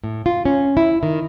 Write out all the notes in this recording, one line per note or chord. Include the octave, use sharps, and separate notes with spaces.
A2
F4
C#4
E4
D#3